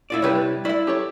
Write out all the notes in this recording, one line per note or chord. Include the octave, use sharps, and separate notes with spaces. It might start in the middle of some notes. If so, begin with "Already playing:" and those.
E4 F4 D5
C3 G3 E4 B4 C#5
E4 F4 D5 E5
G4 A4 C#5